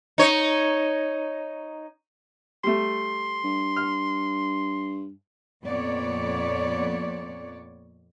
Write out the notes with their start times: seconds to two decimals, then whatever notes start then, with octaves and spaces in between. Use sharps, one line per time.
0.18 D#4 C#5
2.64 G3 A3 C6
3.44 G2
3.77 F6
5.64 F2 A#2 B3 C#5 D5